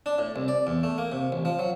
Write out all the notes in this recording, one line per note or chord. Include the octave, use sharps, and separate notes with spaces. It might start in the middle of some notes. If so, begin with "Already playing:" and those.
D4
A2
C2
D5
E2
A3
A#3
C3
A1
F3
F#3